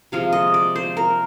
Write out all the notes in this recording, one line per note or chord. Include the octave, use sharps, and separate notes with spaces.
C3 F3 G#3 F5
D#5
D5
C5
A#4